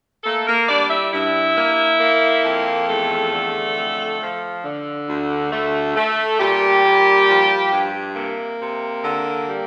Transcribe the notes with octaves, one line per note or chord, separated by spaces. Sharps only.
A3 A#3 A4
A#3 A#4
G3 D4 D5
E4 E5
G2 E4 E5
A#3
A#3
F2
E2 A3 A4
D3
F2
F3
D3
D2
A3
A3
A#2 G3 G4
A#2
F3
G2
C3 A#3
C3
D3
G3